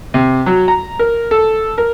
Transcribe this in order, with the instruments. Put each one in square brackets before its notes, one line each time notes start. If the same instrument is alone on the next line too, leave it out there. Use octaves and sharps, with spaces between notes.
[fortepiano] C3
F#3
A#5
A#4
A4
A#4